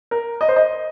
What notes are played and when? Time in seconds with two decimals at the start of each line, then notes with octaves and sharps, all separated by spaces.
0.11 A#4
0.41 D#5
0.49 C5
0.56 D#5